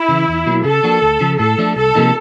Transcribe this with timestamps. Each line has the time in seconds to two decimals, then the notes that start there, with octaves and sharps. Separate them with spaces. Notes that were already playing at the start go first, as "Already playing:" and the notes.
Already playing: E4
0.09 C#3 E3
0.28 E2
0.46 B2 F#3 A#3
0.64 C#3 A4
0.84 F3 A#3 D4 F#4
1.02 D2
1.21 C#3 F3
1.39 A2 A4
1.58 F3 A3 D4
1.76 C2 A4
1.95 C3 F3 A#3 D#4